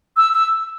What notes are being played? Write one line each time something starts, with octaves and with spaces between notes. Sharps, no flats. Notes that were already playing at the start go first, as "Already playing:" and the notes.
E6
E6